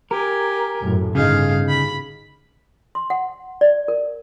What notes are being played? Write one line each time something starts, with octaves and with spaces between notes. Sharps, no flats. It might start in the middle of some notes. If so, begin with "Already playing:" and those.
G4 A#4 G#5
F#2 A2
G1 C#3 D#4 G#4 F5
B5
C6
F#5
D5
A#4